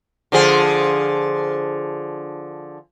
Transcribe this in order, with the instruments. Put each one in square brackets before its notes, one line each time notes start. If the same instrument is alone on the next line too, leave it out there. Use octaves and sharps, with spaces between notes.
[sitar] D3 F3 G#4